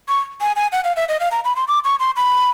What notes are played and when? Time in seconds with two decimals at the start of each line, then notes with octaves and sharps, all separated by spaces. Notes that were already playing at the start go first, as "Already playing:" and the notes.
0.08 C#6
0.41 G#5
0.56 G#5
0.72 F#5
0.84 F5
0.96 E5
1.09 D#5
1.20 F5
1.31 A#5
1.45 B5
1.56 C6
1.68 D6
1.84 C#6
1.99 C6
2.16 B5